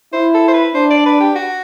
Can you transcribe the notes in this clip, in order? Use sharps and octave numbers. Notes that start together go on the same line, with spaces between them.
E4 C5
A4
C5
B4
D4 C5
D5
B4
G4
F#4